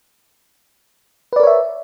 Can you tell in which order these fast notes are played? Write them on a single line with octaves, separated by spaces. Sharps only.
B4 D5 A#4 C#5 E5